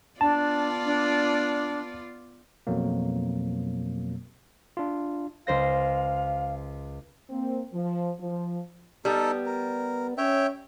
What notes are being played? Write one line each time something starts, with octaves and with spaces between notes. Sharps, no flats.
B3 D4 F4 D5 A5
D4
F2 B2 F#3 A#3
D4 F4
C#2 C5 F5 A#6
A#3 C4
F3
F3
G3 B3 D#4 A4
A#4
C#4 C#5 E5 G5